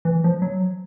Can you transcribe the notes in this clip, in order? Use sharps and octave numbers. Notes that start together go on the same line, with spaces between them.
E3
F3
F#3